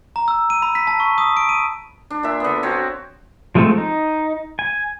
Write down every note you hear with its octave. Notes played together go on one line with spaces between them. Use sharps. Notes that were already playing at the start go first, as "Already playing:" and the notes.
A#5
E6
D#7
B5
B6
A5
C#6
D#6
D7
D#7
D4
A#2 E5
D3 B3
C4 F#4 C#5
F3 G#3 A3 C4 A4
D#4
G#5